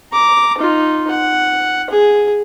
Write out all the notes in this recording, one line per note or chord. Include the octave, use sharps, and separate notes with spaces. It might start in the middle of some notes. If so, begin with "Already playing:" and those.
A#5 D6
D#4 F4
F#5
G#4